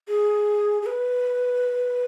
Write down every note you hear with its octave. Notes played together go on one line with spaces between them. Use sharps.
G#4
G#4
B4